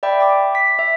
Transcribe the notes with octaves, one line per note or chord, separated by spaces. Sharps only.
D5 E5 G5 B5
G5 D6
B6
E5